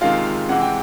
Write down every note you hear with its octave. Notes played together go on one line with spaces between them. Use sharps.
C3 D#3 G#3 F4 F5
C3 E3 G#3 F#5
G5